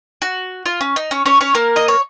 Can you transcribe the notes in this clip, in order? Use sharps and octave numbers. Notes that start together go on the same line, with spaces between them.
F#4
F4
C#4
D#4
C#4 C#5
C#4 C#5
C#4 C#5
A#3 A#4
D#5
C#5